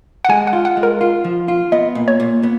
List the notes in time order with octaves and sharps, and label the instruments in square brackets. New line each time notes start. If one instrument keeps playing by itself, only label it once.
[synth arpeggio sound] F#5
[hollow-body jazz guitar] G#3 [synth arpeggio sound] G#5
[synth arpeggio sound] F#5
[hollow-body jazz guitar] F4
[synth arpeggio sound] F#5
[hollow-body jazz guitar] G#3
[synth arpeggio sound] A#4
[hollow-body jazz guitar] F4
F3
F4
[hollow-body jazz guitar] B3 [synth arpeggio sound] D#5
[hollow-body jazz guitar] A#2
[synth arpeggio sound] C#5
[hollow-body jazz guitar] A#2
B3